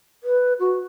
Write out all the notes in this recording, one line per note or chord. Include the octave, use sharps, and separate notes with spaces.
B4
F#4